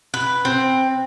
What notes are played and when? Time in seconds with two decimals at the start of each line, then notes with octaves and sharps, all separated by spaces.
0.14 B4
0.45 C4